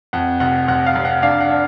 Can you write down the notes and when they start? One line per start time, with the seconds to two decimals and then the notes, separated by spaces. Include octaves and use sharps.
0.13 F2 F#5
0.40 F1 F#5
0.68 F1 F#5
0.86 F5
0.95 F1
1.05 F#5
1.22 D4 F5
1.40 F#5
1.50 D4